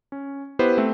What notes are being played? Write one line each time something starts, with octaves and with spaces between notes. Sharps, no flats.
C#4
B3 E4 G4 B4 C5
A3 C4 E5